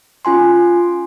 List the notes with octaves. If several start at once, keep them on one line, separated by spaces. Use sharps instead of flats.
C#4 F4 G#5 C6